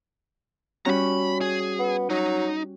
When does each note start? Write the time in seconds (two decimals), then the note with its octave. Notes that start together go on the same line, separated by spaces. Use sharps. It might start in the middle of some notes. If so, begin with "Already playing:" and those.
0.85 G3 C#4 F#4 A#5 B5
1.41 G#4
1.79 B3
2.10 F#3 D#4